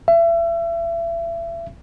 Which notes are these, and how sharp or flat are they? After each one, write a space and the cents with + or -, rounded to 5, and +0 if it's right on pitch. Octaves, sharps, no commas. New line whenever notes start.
E5 +35